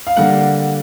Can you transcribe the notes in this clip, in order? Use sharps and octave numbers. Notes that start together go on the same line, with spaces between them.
F5
D3 G3 A#3 F#5